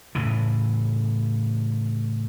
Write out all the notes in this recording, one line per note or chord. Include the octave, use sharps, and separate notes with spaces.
A2 C#3 E3